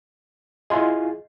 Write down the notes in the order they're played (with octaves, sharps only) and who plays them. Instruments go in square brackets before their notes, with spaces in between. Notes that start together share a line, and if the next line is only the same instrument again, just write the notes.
[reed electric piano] E4 F4 G#4 [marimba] D#5 C6